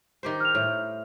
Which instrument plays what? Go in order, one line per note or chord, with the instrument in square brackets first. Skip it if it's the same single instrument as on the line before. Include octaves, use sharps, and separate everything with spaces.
[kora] D#3 G4 C5
[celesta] F6 F7
[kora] A2